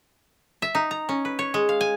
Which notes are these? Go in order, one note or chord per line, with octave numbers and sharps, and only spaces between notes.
E5
D#4
A#5
C#4
B4
C#5
G#3
F5
G#5